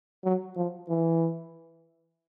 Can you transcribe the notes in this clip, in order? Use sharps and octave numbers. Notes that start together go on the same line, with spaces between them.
F#3
F3
E3